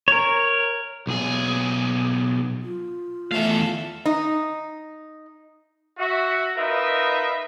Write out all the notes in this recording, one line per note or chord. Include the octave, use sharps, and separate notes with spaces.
A#4 C#5
B1 G#4
F4
E2 A3 A4 E5 F5
D#4
F#4 E5
D#4 F4 A#4 B4 D#5 E5